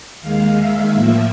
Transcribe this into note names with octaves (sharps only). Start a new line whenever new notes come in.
D#2 D#3 G#3 F5
E5
A2 F3 A#3